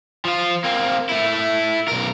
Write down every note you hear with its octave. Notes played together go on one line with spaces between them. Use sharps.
F3 F4
A#3 C4
A3 E4
B1 A#4